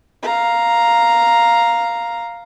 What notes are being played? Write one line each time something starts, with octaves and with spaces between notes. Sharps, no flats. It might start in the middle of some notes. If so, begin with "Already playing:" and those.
F5 A#5